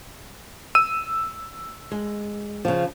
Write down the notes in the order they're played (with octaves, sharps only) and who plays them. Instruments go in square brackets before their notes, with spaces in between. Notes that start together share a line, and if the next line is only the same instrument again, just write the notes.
[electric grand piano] E6 D#7
[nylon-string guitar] G#3
C#3 F3